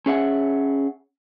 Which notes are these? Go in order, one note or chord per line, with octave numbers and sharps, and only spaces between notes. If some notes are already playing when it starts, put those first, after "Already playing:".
C#4 G#4 E5 F#5